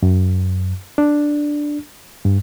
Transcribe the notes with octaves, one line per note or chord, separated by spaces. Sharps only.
F#2
D4
G2